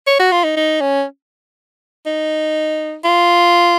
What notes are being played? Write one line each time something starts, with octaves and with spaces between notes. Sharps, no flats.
C#5
F#4
F4
D#4
D#4
C#4
D#4
F4